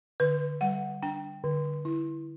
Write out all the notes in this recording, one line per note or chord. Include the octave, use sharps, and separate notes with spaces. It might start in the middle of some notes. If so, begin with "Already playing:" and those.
D3 B4
G3 F#5
D4 G5
D3
E4